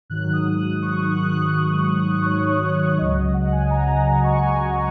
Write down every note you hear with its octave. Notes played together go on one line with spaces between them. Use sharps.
G#2 D#3 F#3 F#6
D#6
D#6
C#6
F#6
F#6
F#6
D#6
C#5
C#5
C#2 C#3 F#3 D#5
D#5
F#5
G#5
A#5
A#5
C#6
G#5